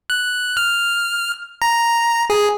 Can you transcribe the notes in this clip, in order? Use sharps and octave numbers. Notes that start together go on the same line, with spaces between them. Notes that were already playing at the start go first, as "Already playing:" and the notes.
F#6
F6
A#5
G#4